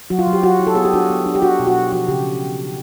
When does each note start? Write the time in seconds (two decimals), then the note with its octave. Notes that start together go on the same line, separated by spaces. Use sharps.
0.10 F#3 F#4
0.19 F4
0.27 F#3
0.33 G4
0.43 F#3 F#4
0.59 E4
0.67 A4
0.75 B3 G#4
0.85 G4
0.93 D4 F#4
1.10 B3
1.26 D4
1.35 G4
1.42 D4 F#4
1.60 B2
1.67 F#4
1.75 D4
1.92 F3 F#4
2.08 C#3 G4